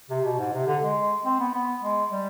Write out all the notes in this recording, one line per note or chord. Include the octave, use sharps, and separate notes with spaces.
C3
B2
G#2
C3
D3
G#3
C4
B3
B3
G#3
G3